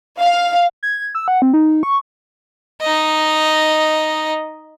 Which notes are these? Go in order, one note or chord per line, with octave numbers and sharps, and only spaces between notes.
F5
G#6
E6
F#5
C4
D#4
C#6
D#4 D#5